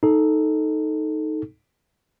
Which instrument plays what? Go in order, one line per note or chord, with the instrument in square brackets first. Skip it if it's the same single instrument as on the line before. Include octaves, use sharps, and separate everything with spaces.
[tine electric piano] D#4 A4